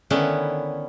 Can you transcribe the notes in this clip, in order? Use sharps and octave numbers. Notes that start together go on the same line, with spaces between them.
D3 D#3 B3 C#4 E4